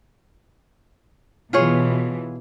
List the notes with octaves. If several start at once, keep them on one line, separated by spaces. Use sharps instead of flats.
B2 E3 F4 G#4 C#5